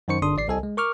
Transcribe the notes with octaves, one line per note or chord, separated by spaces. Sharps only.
F#2 D#3 D#4 C5 C#6 C#7
G1 D3 D4 C6 D#6
A1 D5 C7
C2 C3 A4 D#5 G#5
G#3
A#4 C#6 D6 F6